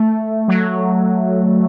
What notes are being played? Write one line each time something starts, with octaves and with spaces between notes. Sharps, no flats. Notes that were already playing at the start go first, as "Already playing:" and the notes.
Already playing: A3
F#3